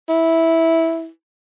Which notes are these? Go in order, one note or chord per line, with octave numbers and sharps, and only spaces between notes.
E4